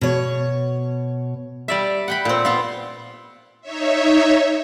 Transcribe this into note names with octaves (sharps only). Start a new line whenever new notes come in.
B2 C#5
G3 D5 E5
F#5 G5 B5
A#2 C4
B3 F4
D#4 C#5 E5